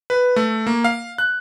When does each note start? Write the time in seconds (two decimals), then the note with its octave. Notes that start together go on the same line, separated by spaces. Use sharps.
0.10 B4
0.36 A3
0.67 A#3
0.84 F5
1.18 F#6